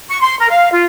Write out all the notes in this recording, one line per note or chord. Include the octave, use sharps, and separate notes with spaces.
C#6
C6
A#4
F5
F4